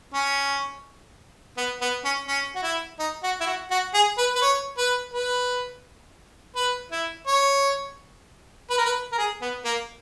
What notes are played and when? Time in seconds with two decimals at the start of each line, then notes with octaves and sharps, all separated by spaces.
0.14 C#4
1.57 B3
1.81 B3
2.05 C#4
2.28 C#4
2.56 F#4
2.63 E4
3.00 D#4
3.23 F#4
3.41 E4
3.47 F#4
3.71 F#4
3.94 G#4
4.18 B4
4.36 B4
4.42 C#5
4.78 B4
5.14 B4
6.56 B4
6.92 E4
7.27 C#5
8.70 B4
8.78 A#4
8.85 B4
9.13 A#4
9.18 G#4
9.42 B3
9.65 A#3